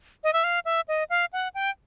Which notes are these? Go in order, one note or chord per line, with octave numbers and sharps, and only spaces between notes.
D#5
E5
F5
E5
D#5
F5
F#5
G5